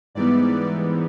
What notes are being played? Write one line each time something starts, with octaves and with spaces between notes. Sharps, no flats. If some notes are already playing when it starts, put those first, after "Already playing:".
G#2 E3 G3 B3 D5